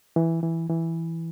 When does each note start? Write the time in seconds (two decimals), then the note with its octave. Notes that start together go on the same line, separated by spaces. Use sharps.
0.16 E3
0.43 E3
0.70 E3